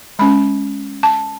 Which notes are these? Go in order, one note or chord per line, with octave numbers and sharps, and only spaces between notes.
G#3 C#4 B5
A5